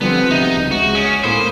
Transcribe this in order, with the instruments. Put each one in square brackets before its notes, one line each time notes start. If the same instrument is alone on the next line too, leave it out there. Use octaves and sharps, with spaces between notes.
[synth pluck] D3 F3 C4 [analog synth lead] G3 [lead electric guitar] B3
[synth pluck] G#1 C3 [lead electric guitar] D#4 [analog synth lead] E5
[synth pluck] C#2
[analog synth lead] G#3 [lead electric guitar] F#4
[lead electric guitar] C#4 [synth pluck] D#6 C#7 D7
[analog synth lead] A2 [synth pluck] A#3 B5 D#6 [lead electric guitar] C5